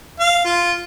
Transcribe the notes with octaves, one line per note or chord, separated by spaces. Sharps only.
F5
F4